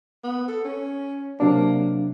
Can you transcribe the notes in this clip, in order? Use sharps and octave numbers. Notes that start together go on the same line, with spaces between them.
B3
A4
C#4
C3 F#3 A#3 D4